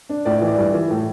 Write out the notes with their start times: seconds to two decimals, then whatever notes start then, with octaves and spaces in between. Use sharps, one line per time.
0.09 D4
0.25 A2 D5
0.37 D5
0.42 E3
0.47 D5
0.58 G2
0.74 E3
0.90 A2